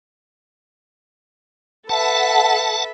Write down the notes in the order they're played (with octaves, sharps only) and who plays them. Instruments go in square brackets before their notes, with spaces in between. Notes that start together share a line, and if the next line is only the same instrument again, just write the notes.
[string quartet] A4 B4 E5 [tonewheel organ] F#5 A5